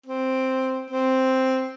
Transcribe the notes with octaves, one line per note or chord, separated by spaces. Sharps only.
C4
C4